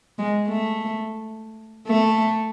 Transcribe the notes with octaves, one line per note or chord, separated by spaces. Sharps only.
G#3
A3
A3